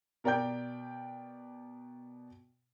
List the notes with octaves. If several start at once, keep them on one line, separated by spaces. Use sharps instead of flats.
B2 A#4 D5 G5 G6